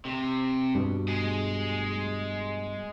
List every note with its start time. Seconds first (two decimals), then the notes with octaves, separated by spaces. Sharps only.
0.05 C3
0.75 G2 B2
1.08 G#3 G#4